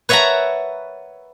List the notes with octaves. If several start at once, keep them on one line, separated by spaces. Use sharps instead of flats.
B4 C#5 E5 F#5 A5 A#5